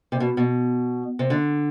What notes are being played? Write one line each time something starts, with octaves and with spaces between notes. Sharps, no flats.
C3
B2
B2
C3
D3